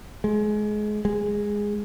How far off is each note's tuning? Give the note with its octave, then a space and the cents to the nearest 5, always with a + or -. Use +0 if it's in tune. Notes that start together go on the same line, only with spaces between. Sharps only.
G#3 +25
G#3 -10